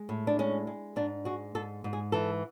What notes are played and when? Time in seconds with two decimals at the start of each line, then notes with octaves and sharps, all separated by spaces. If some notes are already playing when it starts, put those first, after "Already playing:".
Already playing: G#3
0.09 A2
0.27 D4
0.39 G#3 C#4
0.67 G#3
0.96 G#2 D4
1.25 G#3 F#4
1.55 G#2 A4
1.84 G#2
1.93 G#4
2.12 E3 A4